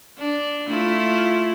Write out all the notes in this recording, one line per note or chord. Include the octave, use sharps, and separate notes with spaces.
D4
A3 E4 F4